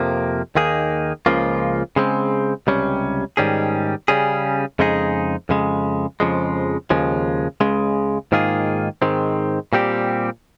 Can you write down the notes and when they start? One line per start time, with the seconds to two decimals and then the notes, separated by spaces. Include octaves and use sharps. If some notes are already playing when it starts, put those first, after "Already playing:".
Already playing: F2 C3 F3 A#3
0.55 D#2 D#3 A#3 D#4 G#4
1.26 C#2 C#3 F3 A#3 F4
1.96 C#3 G#3 C4
2.67 C#2 C3 G3 C#4
3.37 G#2 D#3 G3 C#4 G#4
4.08 C#3 G3 C#4 G#4
4.79 F2 C#3 G#3 D#4 G#4
5.49 F2 C#3 G#3
6.20 F2 C#3 F3 G#3
6.90 D#2 C#3 F3 G#3
7.61 C#2 C#3 G#3
8.32 G#2 D#3 A#3 F4 G#4
9.02 G#2 D#3 G#3 C4
9.73 A#2 G3 C4 G4